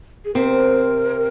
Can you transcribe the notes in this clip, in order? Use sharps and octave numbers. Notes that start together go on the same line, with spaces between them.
G#4
C3 C4 A#4